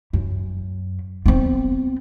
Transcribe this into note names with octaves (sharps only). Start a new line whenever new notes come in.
F#2
B3 C4